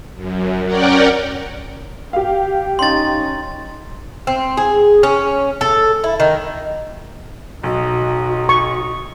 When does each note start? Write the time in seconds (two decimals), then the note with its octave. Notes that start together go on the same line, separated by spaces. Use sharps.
0.15 F#2
0.65 C#4 A#4 D5 F#5 G5
2.13 G4 F5 G5
2.79 C#4 D#4 C6 A6
4.27 C4
4.57 G#4
5.03 C#4
5.61 A4
6.04 E4
6.20 D#3
7.64 B1 D#4 F#4
8.49 C#6